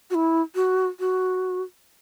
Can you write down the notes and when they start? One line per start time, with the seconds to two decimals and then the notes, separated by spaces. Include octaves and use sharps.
0.10 F#4
0.15 E4
0.55 F#4
1.00 F#4